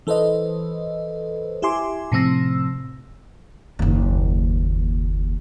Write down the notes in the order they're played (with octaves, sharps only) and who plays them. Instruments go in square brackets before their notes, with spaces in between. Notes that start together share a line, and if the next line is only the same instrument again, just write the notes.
[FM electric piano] E3 A4 B4 C5 D#5
E4 G4 E5 G#5 C6 D6
A2 C3 F3 C4 E6 A#6
[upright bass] F#1 D#2